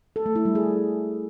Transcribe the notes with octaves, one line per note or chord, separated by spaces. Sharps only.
A4
A3
E4
G3
G#4